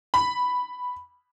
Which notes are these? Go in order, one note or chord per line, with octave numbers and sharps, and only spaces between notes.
B5